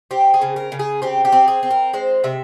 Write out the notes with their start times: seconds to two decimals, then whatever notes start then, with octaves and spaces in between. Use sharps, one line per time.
0.11 C4 G4
0.34 G#4
0.41 C#3
0.56 A#4
0.72 C#3
0.79 G#4
1.02 C4 G4
1.25 G4
1.32 C4
1.48 G#4
1.63 C4
1.70 A#4
1.93 G#3 C5
2.24 C3 E5